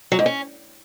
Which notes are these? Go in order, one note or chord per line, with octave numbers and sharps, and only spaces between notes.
F#3
G#2
C#4